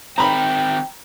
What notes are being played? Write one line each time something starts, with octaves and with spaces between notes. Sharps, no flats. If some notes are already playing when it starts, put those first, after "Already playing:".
D#3 C4 G5 A#5 B5